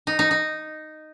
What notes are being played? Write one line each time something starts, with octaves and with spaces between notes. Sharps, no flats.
D#4
D#4
D#4